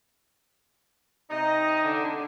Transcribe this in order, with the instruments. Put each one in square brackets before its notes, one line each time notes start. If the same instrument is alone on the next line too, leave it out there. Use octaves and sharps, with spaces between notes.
[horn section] C3 D#4 [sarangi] D#5
[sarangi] D3